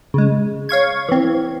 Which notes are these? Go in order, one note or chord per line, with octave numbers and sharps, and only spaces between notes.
C#3 G#3
C#5 F5 C#6 G#6
E3 C4